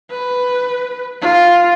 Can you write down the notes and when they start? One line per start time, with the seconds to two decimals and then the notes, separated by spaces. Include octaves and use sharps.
0.11 B4
1.21 F4